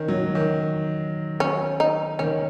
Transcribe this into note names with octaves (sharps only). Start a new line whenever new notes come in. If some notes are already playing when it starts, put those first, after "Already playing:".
Already playing: D#3 C#4
F#3
D#3
C#4
D#4
D#3 C#4